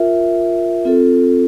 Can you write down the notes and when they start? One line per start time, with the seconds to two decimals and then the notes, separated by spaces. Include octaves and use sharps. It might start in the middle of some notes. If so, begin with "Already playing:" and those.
Already playing: F4 A#4 E5
0.85 C4 F4 A4